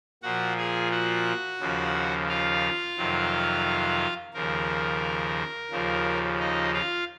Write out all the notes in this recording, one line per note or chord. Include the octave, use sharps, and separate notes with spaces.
A#2 F3 F#4 F#5
G#4 G#5
F#4 F#5
D#2 C#3 F3
F4 F5
F2 C3 D#3 F#3
D#2 C#3 F3 A#4
D#2 C#3 F3
D#4 D#5
F4 F5